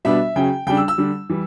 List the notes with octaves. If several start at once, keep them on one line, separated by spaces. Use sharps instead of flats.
B2 G3 B3 D4 E5
C#3 F#3 C#4 G5
C#3 G3 D4 G5
E6
E6
D3 G3 D4
E3 G3